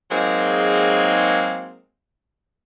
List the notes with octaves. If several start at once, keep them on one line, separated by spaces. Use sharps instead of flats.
F#3 G#3 A#3 C4 D#4 G#4